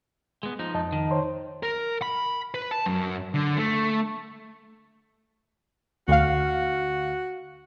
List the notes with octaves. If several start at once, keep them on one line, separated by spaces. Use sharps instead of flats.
G#3 B3
F3 D#4
F2 D#5 A5
D#3
C5 C#5 C6
A#4
B5
B4
A5
F#2
D3
A3
D2 F#4 F5